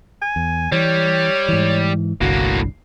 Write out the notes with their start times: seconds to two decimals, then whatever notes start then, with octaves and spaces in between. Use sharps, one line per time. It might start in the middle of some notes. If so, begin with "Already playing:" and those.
0.22 G#5
0.36 E2
0.72 E3 G3 C#5
1.48 G#2 E3
2.21 G1 C2 A2 D3 A#3 F#4